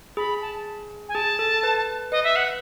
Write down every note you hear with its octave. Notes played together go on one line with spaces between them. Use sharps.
G#4 B5
A5
G#5
G#4 A5
A4
B4
B4 D#5
E5
F#5